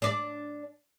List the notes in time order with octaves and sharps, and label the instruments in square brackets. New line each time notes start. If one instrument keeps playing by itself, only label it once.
[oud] D4 D5